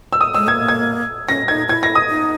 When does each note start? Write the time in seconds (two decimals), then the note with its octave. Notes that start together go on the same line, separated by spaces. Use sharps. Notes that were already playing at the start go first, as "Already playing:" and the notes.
0.13 E6
0.21 D#6
0.34 G#3 E6
0.47 A#3 G#6
0.68 G#6
1.29 C#4 A#6
1.48 D#4 G#6
1.69 E4 G#6
1.83 A#6
1.95 D#6
2.09 D#4